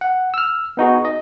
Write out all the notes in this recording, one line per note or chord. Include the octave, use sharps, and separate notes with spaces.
F#5
E6 F6
B3 D#4 F#4 G#4
D#5